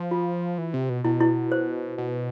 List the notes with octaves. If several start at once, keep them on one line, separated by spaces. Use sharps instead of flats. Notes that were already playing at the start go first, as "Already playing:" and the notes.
Already playing: F3
F4
E3
C3
B2
B2 E4
E4
C5
B2